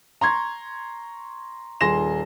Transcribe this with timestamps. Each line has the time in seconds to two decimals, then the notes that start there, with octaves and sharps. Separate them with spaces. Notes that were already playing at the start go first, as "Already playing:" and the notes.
0.21 A#5 C6 C#6 G#6
1.81 D#1 G#4 C6 A#6 E7